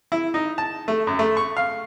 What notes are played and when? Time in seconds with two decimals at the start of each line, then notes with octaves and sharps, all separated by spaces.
0.12 E4
0.34 D#4
0.58 A5
0.88 A3
1.07 F#2
1.19 A3
1.37 C#6
1.57 F5